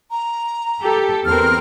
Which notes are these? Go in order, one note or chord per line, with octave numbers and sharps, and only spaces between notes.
A#5
G4 A4
E2 C4 A#4 F6